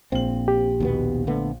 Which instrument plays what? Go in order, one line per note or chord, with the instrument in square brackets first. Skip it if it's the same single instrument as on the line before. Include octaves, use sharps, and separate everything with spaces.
[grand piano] A#1 F#7 [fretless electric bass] C4
[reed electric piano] G4
[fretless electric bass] D#2 B2 B3
D3 A3 B3